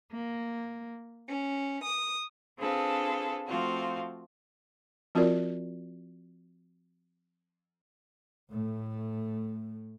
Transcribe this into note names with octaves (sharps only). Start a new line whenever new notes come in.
A#3
C#4
D#6
C4 D4 F4 G#4 A4 B4
F3 A3 C4 F4 F#4
F3 C4 F4 F#4 A#4 D5
A2 A3